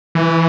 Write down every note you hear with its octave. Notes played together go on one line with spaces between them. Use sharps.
E3